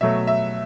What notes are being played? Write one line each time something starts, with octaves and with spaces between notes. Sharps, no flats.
B2 F#3 A3 E5
E5